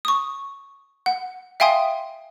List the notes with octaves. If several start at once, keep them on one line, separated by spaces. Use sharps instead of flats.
C#6 D#6
F#5
E5 F5 G5 G#5 C6 D#6